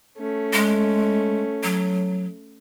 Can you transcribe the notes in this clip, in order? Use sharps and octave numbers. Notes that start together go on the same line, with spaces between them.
A3 C#4
G#3
F#3